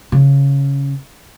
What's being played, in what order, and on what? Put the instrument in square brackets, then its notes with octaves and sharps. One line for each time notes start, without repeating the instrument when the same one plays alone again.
[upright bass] C#3